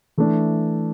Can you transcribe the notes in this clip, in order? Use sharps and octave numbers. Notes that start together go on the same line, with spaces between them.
E3 A3 D4